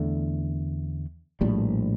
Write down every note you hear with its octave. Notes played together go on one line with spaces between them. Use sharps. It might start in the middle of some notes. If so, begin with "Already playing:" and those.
Already playing: E2 D3 A3
A#1 A2 G3